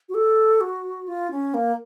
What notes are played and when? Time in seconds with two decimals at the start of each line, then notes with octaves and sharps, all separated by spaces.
0.09 F#4
0.14 A4
0.61 F#4
1.08 F4
1.31 C#4
1.54 A#3